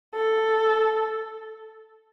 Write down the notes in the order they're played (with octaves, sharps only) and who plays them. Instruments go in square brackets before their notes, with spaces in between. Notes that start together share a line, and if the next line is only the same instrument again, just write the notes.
[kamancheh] A4